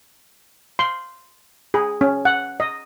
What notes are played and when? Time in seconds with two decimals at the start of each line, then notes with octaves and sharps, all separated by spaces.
0.79 C6
1.74 G#4
2.01 C#4
2.25 F#5
2.60 D#5